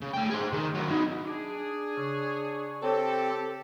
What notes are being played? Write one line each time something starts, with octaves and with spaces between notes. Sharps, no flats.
C#3
A3 G5
G#4 C5
D#3
F#3 E4
D#4 F#4
D4 G#4 D6
C#3 C#5
C4 G4 A4 C#5